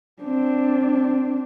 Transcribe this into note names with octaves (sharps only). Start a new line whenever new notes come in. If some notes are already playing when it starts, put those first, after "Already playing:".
C4 D4